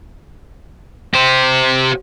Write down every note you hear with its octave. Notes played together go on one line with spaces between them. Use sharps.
G4 C5